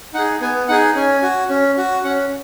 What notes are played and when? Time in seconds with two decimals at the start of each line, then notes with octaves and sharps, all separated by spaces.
0.14 D#4 F#5
0.18 G#4
0.41 B3 G#5
0.68 D#4 G#4 F#5
0.95 C#4 G#5
1.22 F#4
1.49 C#4
1.77 F#4
2.04 C#4 F#5